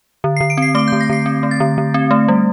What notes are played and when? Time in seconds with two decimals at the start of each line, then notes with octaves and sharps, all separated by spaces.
0.24 D3
0.36 C7
0.40 D3
0.50 D7
0.57 C4 C7
0.75 A3 D6
0.88 G6
0.92 D3
1.01 A#6
1.09 D3 C7
1.26 C4
1.43 A3
1.51 A6
1.60 D3
1.78 D3
1.94 C4
2.11 A3
2.28 G3